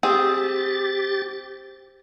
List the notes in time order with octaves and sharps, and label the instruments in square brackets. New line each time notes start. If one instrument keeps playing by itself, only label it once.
[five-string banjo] C4 G#4 [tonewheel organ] G4 A6